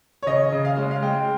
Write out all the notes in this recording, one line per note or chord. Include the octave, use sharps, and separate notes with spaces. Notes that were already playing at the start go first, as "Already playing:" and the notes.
C#5
C#3 D#5
C#3
F5
G#3
F5
G#3 G5